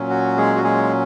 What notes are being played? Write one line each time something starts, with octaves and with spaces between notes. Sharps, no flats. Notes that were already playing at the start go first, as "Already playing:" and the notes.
Already playing: A#2 F#3 C#4
F#4
G#3 G#4
F#4
G#3 G#4